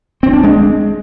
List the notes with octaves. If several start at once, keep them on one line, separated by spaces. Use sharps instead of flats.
C4
D4
G#3